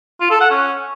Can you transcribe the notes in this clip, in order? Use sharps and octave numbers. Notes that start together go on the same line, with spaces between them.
F4
A4
F#5
C#4